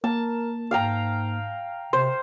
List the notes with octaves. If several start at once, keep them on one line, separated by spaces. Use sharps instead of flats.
A#3 A#4 A5
G#2 F5 G5 A#5
C3 C5 C6